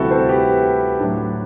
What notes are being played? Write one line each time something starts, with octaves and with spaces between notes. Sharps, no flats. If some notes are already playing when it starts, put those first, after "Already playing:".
Already playing: D2 C3 E3 G3 C4 E4 F#4 A4
A4 C5
G4 B4
A2 F#3 A3 D4